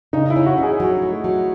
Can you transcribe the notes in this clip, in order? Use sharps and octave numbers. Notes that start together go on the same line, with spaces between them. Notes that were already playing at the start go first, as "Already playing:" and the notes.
C#3 D#4
E4
C#4
F#4
C#4 G#4
F#3
A3
F#3